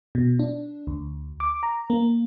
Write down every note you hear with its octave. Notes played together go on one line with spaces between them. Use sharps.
B2
D4
D2
D6
A#5
A#3